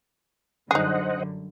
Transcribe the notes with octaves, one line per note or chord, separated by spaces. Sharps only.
F#2 D3 G3 D#4 G#4 C5 D#5 F#5